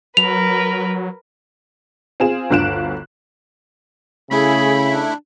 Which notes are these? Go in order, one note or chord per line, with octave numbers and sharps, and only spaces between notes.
F#3 A#4 B4 F7
C4 F4 G#4 E7
G1 D2 F4 F#6 D7 E7
C#3 A3 E4 G#4 B5
D4